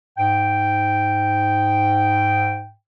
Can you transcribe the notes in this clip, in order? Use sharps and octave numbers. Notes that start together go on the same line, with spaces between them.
G#2 G5